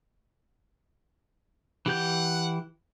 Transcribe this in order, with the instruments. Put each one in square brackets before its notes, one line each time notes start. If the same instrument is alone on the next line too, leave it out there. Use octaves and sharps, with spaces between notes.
[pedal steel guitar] E3 G4 G6 [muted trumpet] F#5